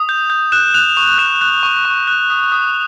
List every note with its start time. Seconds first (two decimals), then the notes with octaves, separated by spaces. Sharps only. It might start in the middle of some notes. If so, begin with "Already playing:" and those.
Already playing: D#6
0.09 G6
0.30 G6
0.52 F#6 E7
0.74 F#6 F7
0.97 C#6 F7
1.18 F#6 E7
1.41 F#6
1.63 C#6
1.85 C#6
2.07 F#6
2.30 D#6
2.52 D#6